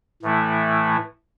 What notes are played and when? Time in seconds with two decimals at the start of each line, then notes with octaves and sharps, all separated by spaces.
0.22 A2 E3 A3 E4